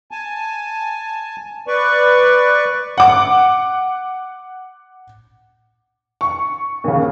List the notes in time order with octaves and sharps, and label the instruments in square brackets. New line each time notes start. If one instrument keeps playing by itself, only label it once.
[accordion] G#5 A5
B4 D5 C#6
[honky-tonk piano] F#5 D6
C#6
D#2 C#3